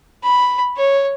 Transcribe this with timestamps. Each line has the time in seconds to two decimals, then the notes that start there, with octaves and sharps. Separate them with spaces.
0.23 B5
0.77 C#5